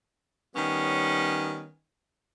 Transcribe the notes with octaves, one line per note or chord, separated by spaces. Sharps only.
D#3 G3 B3 C#4